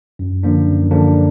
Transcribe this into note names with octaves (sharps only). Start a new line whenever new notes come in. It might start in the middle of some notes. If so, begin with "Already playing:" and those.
F#2
D3 F3 A#3 D4
F#2
D3 F3 A#3 D4